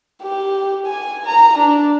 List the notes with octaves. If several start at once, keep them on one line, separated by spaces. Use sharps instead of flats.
G4
G#5
A#5
D4